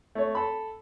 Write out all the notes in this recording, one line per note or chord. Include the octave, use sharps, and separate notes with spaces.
A3 C#5
A4 B5